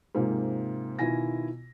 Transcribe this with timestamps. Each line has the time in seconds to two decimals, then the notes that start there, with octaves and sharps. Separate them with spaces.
0.15 G#2 C3 A#3 F4
0.99 B2 D#3 E4 F4 G#5 A#6